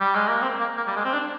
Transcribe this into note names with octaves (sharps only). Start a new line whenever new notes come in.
G3
G#3
A#3
C4
A#3
A#3
G3
G#3
C4
D4